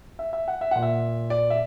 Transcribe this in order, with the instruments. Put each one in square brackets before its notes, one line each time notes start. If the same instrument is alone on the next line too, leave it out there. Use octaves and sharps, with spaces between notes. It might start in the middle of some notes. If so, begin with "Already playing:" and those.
[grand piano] E5
E5
F#5
E5
A#2 F#5
E5
D5
E5